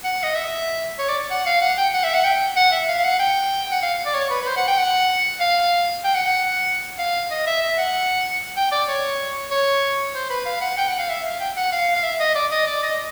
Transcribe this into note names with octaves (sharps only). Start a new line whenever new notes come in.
F#5
D#5
E5
C#5
D5
F#5
F5
F#5
G5
F#5
E5
F#5
G5
F#5
E5
F5
F5
F#5
G5
F#5
F5
D5
C#5
B4
B4
C5
F#5
G5
F#5
F5
G5
F#5
F#5
F5
D#5
E5
E5
F#5
G5
D5
C#5
C#5
C5
B4
F5
F#5
G5
F#5
F5
E5
F5
G5
F#5
F5
F5
E5
D#5
D5
D#5
D5
D#5